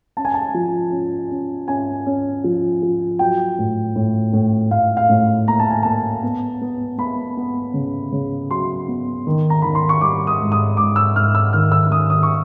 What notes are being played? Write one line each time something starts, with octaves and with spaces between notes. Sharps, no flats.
C#4 A5
G#5
A5
F3
C#4
C#4
C#4 G#5
C#4
F3
F3
F#3 G5
A2
A2
A2
A2 F5
F5
A2
A#3 A#5
A5
G#5
A#3 A5
B3
B3
B3 B5
B3
C#3
C#3
F#3 C6
B3
D#3
A#5
D#3 B5
C6
C#6
G3 D6
D#6
G#2
D#6
G#2 D6
E6
G#2 F6
E6
D#3 F6
E6
D#3 D#6
D#6
C#6